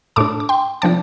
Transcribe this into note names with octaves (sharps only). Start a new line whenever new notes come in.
A2 A3 D4 A5 D6
D6
G5 C6
C3 F3 D4 A5 D6